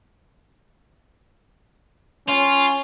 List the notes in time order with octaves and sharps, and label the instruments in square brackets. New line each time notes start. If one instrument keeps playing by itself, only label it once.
[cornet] C#4 [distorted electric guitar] F4